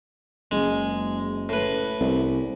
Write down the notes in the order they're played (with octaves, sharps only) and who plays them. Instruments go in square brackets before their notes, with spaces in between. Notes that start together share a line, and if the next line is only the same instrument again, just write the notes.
[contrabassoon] F#1 [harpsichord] G#3
[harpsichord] A2 B4
[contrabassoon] C2